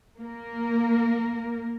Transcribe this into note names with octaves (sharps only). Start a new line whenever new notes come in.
A#3 A#4